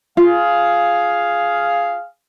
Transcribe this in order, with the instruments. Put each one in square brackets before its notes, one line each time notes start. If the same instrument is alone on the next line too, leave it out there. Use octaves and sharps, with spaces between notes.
[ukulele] F4 [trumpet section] G#4 F5